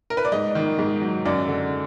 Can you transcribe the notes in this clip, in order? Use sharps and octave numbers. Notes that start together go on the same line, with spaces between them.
A#4
B4
D5
G#2 D#5
D#3
G#2
F#3
F#2 D5
D3